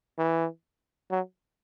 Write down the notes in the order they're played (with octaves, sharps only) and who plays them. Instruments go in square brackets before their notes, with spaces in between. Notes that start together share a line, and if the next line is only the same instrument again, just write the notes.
[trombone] E3
F#3